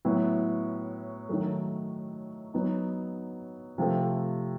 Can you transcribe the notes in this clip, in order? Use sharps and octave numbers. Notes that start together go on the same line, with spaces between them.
A2 F#3 B3 E4
D#3 F#3 A3
F#3 B3 D#4
C3 F3 A3